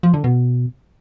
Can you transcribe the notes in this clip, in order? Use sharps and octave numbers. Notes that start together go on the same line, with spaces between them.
F3
D3
B2